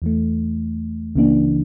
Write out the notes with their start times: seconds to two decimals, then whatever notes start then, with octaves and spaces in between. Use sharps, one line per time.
0.02 E2 E3 A3
1.15 C#2 C#3 E3 A#3 D4